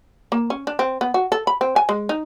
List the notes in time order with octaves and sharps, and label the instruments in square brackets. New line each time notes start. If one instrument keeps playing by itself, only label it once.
[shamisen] A#3
C#4
D4
C4
B3
F#4
A4
B5
C4
G#5
G#3
D#4